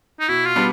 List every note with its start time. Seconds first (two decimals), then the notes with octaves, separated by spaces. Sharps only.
0.20 D#4
0.28 B2 E4
0.47 F4
0.56 G3 B3 D4